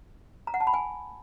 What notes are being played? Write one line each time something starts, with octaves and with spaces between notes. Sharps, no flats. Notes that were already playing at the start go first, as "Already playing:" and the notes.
A#5
F#5
A5
B5
G#5